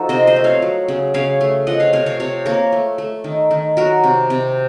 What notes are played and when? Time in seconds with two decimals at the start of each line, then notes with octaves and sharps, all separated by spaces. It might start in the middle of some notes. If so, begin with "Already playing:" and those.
Already playing: F3 D#4 F#4 A4
0.09 C3 C5 D#5
0.27 C5 D#5
0.36 A3
0.44 C#5 F5
0.62 F#3
0.88 C#3
1.14 C#3 C#5 F5
1.41 A3
1.67 F3 D#5 F#5
1.80 C#5 F5
1.93 C3 C#5 F5
2.06 C#5 F5
2.20 C3 C#5 F5
2.46 A#3 A#4 C#5
2.72 A3
2.98 A3
3.24 D#3
3.51 D#3
3.77 F#3 F#4 A#4
4.04 C3
4.30 C3